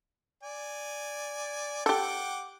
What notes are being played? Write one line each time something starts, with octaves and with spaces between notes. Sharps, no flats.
D5 G#5
G4 A4 F#5 G5 D6